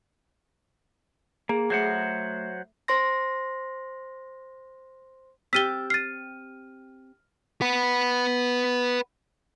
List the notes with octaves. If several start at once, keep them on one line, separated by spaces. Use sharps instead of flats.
A#3 G#4
F#3 A3 C5 E5 F#5 C7
C5 C6 A#6
C4 G4 E6 F6 A6 B6 D#7 G7
F6 A6 C7 D#7
B4 F#5